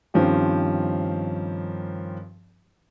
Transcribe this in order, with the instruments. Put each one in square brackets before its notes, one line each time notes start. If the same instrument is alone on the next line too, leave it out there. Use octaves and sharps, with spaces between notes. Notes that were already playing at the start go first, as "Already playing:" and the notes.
[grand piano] G2 D#3 F3 C4 C#4 G4